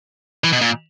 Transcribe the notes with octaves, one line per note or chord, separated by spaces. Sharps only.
E3
B2
A#2